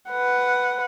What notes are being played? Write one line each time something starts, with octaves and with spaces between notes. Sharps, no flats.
B4 F#5